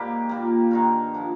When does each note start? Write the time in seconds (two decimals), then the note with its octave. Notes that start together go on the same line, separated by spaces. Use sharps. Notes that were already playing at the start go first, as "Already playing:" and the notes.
Already playing: G#2 G3 A#3 G4
0.29 A#2 G3 A#3
0.71 G2 D#3 G#3 A#4
1.14 D3 F3 A#3